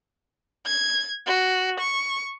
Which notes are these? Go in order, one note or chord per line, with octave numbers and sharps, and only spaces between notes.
G#6
F#4
C#6